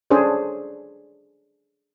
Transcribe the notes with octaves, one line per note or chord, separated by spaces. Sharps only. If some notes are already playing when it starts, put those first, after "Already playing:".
C#4 D4 G#4 A4 C5 D5